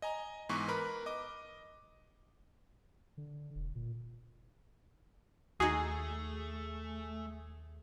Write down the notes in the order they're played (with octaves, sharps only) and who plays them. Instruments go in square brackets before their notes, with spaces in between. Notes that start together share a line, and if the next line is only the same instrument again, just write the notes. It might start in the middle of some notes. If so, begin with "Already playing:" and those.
[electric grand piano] D#5 G#5 A#5
G#2 E3 B3 C#6 D6
A#4 B4 B5
D#5 D6
[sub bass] D3
E1
A#2
[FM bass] D#2 [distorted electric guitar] A3 [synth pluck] D#4 F#4 [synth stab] G#4